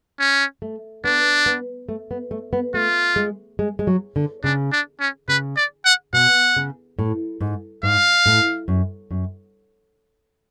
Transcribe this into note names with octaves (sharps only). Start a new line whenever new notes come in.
C#4
A3
B3 D4
B3
A3
B3
A3
B3
A3 F4
G#3
G#3
G#3
F#3
D3
C#3 D4
D4
C#4
C#3 B4
D5
F#5
B2 F#5
C#3
A2
G#2
G#2 F5
A2
F#2
F#2